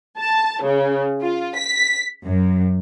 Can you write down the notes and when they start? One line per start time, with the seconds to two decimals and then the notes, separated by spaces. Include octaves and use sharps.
0.19 A5
0.64 C#3
1.22 F4
1.58 B6
2.25 F#2